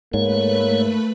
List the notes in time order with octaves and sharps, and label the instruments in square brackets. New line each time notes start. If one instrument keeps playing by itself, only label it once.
[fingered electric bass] G#2 [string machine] A3 B4 B5 [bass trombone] A#3 [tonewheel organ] C#5